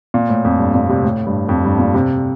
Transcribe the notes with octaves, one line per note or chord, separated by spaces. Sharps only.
A#2
A2
F2
G2
A#2
C3
A2
G2
F2
G2
A#2
C3